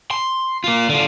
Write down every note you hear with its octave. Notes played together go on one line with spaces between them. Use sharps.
C6
A#3 F4
D3 F4